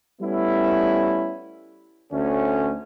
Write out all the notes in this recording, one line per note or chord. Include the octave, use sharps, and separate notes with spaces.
G3 A3 B3 C#4 E4
D2 D3 A3 C#4